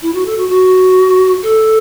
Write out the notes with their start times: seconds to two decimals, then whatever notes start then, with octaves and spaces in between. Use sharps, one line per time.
0.02 E4
0.14 F#4
0.25 A4
0.37 F#4
0.49 F#4
1.42 A4